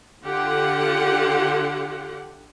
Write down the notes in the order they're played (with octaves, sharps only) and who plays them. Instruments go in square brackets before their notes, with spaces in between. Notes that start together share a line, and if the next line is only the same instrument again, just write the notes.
[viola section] D3 F4 G4 F#5